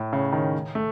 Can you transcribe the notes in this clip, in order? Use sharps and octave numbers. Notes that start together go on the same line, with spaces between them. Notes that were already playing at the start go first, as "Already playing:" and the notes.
Already playing: A2
C#3
D#3
A3